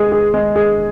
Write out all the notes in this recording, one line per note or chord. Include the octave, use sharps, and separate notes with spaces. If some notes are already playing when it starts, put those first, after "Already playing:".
Already playing: G#3 G#4
G#4
G#3
G#4